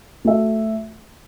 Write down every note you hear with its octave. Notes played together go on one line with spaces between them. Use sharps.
A3 F#4 A4 E5